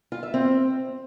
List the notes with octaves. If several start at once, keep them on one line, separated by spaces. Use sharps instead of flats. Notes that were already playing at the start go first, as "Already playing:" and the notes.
F4
E5
C4